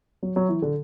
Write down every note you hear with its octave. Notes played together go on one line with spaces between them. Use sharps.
F#3
F#3
E3
D3